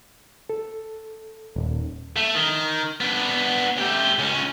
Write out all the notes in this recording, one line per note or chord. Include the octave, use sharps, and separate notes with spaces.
A4
D#1
A3
D#3
B3 D4
A3 G4
C#2 C#4